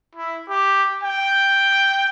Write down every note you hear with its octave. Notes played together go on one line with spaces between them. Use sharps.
E4
G4
G5